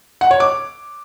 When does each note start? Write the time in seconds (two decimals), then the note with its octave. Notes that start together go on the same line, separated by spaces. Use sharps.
0.21 F#5
0.31 C#5
0.40 D6